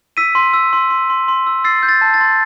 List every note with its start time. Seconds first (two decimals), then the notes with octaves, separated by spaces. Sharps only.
0.17 E6 B6 D#7
0.35 C6
0.53 E6
0.73 C6
0.90 C6
1.10 C6
1.28 C6
1.47 E6
1.64 E6 A6 C7
1.83 G6
1.89 A6
2.01 A5
2.14 A6
2.20 C6